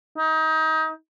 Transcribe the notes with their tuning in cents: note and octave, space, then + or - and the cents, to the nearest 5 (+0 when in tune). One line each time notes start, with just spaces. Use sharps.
D#4 +25